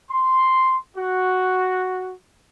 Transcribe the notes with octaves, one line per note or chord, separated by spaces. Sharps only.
C6
F#4